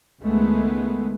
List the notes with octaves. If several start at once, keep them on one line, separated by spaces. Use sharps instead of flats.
C#2 D#3 G#3 A3 B3